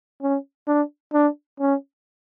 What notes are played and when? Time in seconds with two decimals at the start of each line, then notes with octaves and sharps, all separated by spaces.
0.22 C#4
0.68 D4
1.13 D4
1.60 C#4